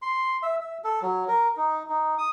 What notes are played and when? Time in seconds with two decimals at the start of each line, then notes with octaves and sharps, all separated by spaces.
0.02 C6
0.43 E5
0.61 E5
0.84 A4
1.02 F#3
1.28 A#4
1.57 D#4
1.89 D#4
2.18 D#6